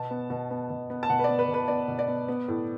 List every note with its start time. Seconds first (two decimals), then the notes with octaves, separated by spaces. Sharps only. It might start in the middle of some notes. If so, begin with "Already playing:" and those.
Already playing: B2 A5
0.10 B3
0.30 B2
0.50 B3
0.70 B2
0.90 B3
1.03 A5
1.10 B2 F#5
1.19 B4
1.24 D5
1.28 B3
1.39 B4
1.48 B2
1.54 B4
1.68 B3 D5
1.88 B2
1.99 D5
2.08 B3
2.28 B3
2.48 A2